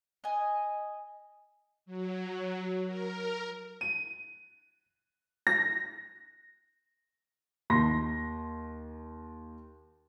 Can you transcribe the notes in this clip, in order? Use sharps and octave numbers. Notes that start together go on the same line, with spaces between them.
D#5 G#5
F#3
A#4
D#7
A#6
D#2 C6 A#6